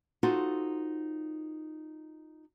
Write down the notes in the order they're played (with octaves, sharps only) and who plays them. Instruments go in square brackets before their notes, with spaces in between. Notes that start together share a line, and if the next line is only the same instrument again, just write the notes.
[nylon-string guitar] D#4 F4 F#4 A4 C5